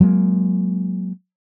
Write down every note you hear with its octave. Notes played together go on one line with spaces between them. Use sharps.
F#3 G#3 A#3